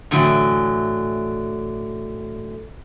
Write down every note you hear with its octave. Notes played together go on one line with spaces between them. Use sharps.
A2 D3 E3 F#3